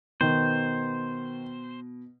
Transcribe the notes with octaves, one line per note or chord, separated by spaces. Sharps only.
B2 D#3 C5